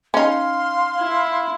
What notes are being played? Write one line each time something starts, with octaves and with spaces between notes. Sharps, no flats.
C#4 D#4 F5 C6
E4